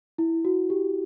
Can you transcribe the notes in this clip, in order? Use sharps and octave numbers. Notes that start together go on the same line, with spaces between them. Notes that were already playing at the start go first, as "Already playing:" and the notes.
E4
F#4
G4